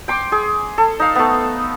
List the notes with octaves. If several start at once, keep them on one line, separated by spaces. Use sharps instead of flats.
G5 C6 D6
G#4
A4
D#4 F5
A3 B3